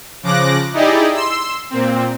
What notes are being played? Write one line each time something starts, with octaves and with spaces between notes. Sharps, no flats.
C#3 F3 D6 F#6 A#6
D#4 E4 G4 G#4 D5 D#5
C6 E6
A#2 C4